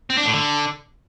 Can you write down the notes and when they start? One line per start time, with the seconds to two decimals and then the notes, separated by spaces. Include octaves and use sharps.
0.10 C4
0.18 D4
0.26 A2
0.34 D3